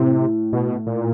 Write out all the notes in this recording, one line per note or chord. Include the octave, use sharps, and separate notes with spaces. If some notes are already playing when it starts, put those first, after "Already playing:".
Already playing: A2 C3
B2
A#2